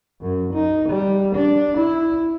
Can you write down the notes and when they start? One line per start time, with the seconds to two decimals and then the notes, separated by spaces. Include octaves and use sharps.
0.21 F#2
0.53 D#4
0.89 G3
1.35 D4
1.77 E4